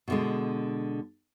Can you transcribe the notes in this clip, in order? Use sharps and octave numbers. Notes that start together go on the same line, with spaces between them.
B2 D3 G#3